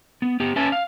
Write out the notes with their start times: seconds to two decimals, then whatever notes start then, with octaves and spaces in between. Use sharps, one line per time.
0.22 B3
0.40 B3 G4
0.56 C#4 B4 E5 G#5 A5
0.72 F5